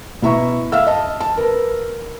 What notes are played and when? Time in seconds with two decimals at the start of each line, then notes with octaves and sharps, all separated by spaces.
0.22 B2 E4 E5 A#5 C#6
0.72 E5 F5 E6 F6
0.87 D#5 A5
1.21 A5
1.37 A#4 B4